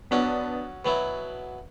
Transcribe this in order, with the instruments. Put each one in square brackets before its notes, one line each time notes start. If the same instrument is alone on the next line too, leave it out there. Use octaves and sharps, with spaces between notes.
[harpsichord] F#3 C#4 F#4 [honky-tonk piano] B3 D4
[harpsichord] B2 F#3 B3 E4